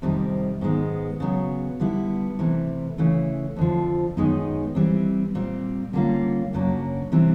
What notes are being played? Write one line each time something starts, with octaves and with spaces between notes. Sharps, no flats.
F2 C3 D#3 G3
G#2 D#3 G#3 B3
C#3 F#3 B3
D3 G3 B3 E4
C3 E3 A3
C#3 E3 A3
F2 D3 F3
F#2 D#3 G#3 B3 D#4
E3 G3 C4
A#2 G3 C4
D3 G3 A#3 C#4 F4
F#2 C#3 F#3 A#3 D4
C3 E3 G3 C4